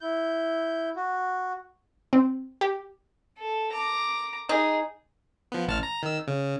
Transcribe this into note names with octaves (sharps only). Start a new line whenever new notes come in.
E4 G6
F#4
C4
G4
A4
A#5 D6
D#4 G#4
F3 B3
A1 A5 F6
A#5
D#3 E6
C#3